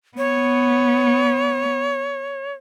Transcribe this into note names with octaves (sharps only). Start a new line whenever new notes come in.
B3 C#5